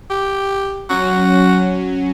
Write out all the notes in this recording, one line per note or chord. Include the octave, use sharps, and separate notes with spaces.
G4
F#3 C#4 F#4